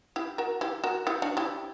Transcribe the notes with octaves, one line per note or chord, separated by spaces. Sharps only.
E4 G4
F#4 A#4
E4 G4
F#4 A#4
E4 G4
D4 F#4
E4 G4